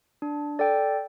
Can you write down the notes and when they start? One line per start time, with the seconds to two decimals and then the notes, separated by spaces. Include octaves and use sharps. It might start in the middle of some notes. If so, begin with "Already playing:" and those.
0.22 D4
0.59 A4 D5 G5